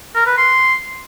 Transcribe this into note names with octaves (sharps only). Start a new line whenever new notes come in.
A#4
B4
C6